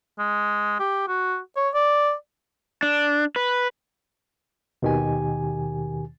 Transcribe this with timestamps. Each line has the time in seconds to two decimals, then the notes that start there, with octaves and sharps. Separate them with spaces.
0.19 G#3
0.80 G4
1.08 F#4
1.56 C#5
1.74 D5
2.83 D4
3.36 B4
4.82 D#2 B2 D#3 G4 G#5